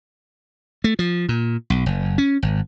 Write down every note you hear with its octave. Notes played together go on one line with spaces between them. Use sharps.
A3
F3
A#2
B1
F#1
C#4
G#1